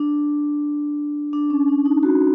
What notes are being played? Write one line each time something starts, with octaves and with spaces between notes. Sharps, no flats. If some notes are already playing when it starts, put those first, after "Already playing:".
Already playing: D4
D4
C#4
D4
D#4
F#4